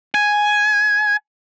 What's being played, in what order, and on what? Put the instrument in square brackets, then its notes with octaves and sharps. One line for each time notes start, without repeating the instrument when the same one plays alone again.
[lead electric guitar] G#5